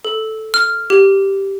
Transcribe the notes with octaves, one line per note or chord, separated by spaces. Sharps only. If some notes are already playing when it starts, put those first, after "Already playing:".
A4
F6
G4